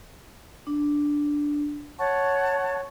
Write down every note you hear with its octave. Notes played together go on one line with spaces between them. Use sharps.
D4
C#5 F#5 A5 C#6